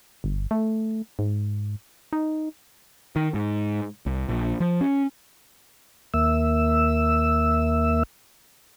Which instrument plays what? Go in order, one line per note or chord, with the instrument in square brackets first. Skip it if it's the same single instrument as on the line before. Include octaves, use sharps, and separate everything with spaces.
[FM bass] G1
A3
G#2
D#4
[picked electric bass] D#3
G#2
C2
A#1
F3
C#4
[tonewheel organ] D#2 A#3 E5 E6